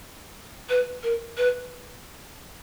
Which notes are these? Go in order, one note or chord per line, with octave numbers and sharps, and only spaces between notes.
B4
A#4
B4